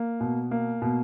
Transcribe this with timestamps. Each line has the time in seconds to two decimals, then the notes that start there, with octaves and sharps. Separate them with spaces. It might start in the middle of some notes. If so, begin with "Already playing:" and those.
Already playing: A#3
0.20 B2
0.51 A#3
0.82 B2